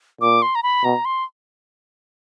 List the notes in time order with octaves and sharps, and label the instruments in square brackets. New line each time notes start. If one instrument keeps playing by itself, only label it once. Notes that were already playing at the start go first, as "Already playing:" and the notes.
[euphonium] A#2 [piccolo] D6
[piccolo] C6
A#5
B5
[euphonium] B2 [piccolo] A#5
[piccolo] C6